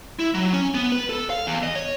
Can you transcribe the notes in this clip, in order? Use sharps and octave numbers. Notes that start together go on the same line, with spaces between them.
E4
F#3
C#4
B3
B4
A4
F5
E2
D#5
C#5